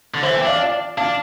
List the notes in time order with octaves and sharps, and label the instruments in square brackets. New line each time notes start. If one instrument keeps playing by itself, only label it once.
[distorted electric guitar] D3
[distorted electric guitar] E3 [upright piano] C5 E5
[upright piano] E5 G5
[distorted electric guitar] D4
[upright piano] D5 F5
D5 F5
[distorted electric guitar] D4 [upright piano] F5 A5